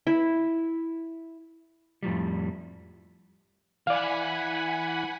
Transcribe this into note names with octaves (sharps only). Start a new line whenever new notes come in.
E4
F2 A2 F3 G3
E3 D5 F5 F#5 G#5 B5